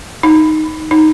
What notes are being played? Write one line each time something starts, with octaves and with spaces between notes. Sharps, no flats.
D#4
D#4